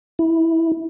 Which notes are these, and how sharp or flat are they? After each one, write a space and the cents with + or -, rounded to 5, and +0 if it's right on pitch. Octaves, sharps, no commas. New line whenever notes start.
E4 -10